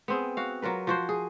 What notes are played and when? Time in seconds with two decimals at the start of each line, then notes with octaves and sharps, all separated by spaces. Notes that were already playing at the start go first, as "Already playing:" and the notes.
0.08 B3 C4 G#4
0.37 F#4 F5
0.62 F#3 F4 A#4 B4
0.87 F3 F#4 C5
1.09 G#4